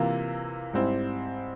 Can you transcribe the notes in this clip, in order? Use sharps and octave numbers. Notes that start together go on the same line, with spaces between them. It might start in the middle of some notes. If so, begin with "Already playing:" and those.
Already playing: C3 E3 A#3 F4
G#2 G3 C4 E4